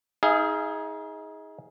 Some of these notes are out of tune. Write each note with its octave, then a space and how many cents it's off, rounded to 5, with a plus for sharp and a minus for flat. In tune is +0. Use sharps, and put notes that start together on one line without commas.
D#4 +30 G#4 +0 F5 -30